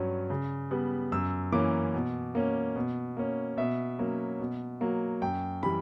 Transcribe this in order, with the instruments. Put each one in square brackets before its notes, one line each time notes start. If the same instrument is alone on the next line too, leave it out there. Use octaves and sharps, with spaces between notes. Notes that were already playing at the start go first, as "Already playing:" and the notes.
Already playing: [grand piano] G2 F#3 C#4
C#3
G3 B3
F#2 E6
E3 A#3 C#4 D6
B2
A#3 C#4
B2
A#3 C#4
B2 E5
F#3 A#3 C#4
B2
F#3 A#3
F#2 G5
E3 G3 B5